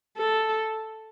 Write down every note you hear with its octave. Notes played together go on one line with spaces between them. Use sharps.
A4